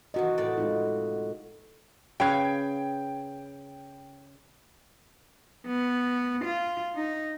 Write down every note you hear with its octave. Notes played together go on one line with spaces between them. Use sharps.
C3 D#3 E3 F#4 D#5
A2 D5 A5
G#3 D#4 F4
C#3 B4 F5 G5 G#6
B3
F4
D#4